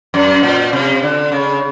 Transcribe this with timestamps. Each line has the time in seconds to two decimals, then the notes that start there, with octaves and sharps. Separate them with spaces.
0.14 F#2
0.43 A#2
0.73 C3
1.03 D3
1.32 C#3